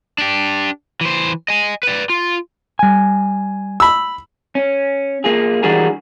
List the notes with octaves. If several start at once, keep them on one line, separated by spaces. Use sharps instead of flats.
D4 G4
E3 C5
D#5 G#5
B4 D5
F4
G3 G#5
B5 E6
C#4
A#3 F4 G#4
E3 G3 D4 F#4 G#4 A#4